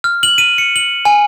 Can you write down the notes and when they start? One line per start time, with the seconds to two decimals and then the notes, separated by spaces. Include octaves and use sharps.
0.04 F6
0.23 F#7
0.38 D#7
0.58 C#7
0.76 F#7
1.05 G#5